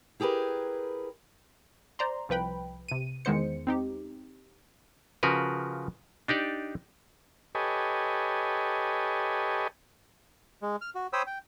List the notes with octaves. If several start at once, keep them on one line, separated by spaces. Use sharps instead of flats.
E4 G4 G#4 A#4 B4
C5 D5 A#5 C6
C2 F3 B4 G5 B5
C3 D#7
E2 D#3 G#3 B3 C5 C#7
C4 D#4 G4
C#3 F3 F#4 A#4 B4
D4 D#4 G4 D5
G4 A4 B4 C#5 D#5 G#5
G#3
F6
F#4
C5 C#5 G5 B5 D#6 E6
G5